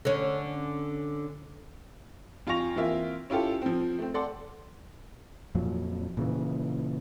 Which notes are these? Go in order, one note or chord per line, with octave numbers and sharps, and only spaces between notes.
D3 C#4
F2 F4 G#5 C#6 A#6 F7
E3 A#3 C4 F4 E5
C#4 E4 F4 G4 A4
F3 C4
A3 C4
A4 D5 F#5 C6
F2 A#2 F3 F#3
A#2 C#3 E3